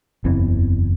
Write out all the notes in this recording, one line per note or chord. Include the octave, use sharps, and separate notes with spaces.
F#1 E2 E3 C4